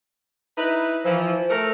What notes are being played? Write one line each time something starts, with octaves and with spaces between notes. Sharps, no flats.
D#4 E4 B4
E3 F3 C5
A3 A#4